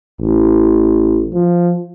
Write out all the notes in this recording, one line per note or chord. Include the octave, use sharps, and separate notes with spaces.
A1
F3